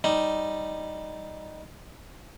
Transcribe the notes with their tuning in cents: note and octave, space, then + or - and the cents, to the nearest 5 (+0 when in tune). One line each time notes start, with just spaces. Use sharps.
G3 +0 D#4 +0